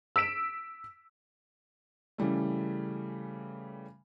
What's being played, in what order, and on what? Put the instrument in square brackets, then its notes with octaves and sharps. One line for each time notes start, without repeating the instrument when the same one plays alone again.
[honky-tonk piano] E6 B6 D7 E7
[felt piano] C#3 E3 G3 A3